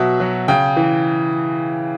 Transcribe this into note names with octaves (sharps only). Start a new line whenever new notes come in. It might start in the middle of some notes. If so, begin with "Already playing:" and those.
Already playing: B2 F#3 E5 F#5
F#3
C#3 G5
E3